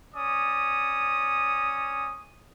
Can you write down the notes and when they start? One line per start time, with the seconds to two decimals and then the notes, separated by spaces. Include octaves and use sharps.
0.15 C#4 D5 D#6